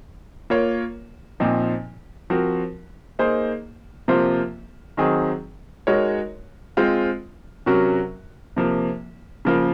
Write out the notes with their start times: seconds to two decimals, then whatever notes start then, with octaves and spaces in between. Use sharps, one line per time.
0.50 A#3 F4 A#4 C#5
1.40 A#2 F3 C4 D#4
2.30 F3 C4 F#4 A#4
3.19 A#3 D#4 G#4 C5
4.08 C3 F3 A#3 F4 C5
4.97 D#3 F#3 C4 D#4 G#4
5.87 G#3 D#4 F#4 A#4 C#5
6.77 G#3 C4 F4 C5
7.66 C3 F#3 C#4 F#4 A#4
8.56 C3 F3 A#3
9.45 C#3 F3 A#3 F4 A#4